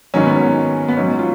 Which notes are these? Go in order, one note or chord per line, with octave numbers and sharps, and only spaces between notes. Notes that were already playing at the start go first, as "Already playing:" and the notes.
G#2 D#3 F#3 C#4
B3
C#4
B3
G#2 F#3 C#4
F4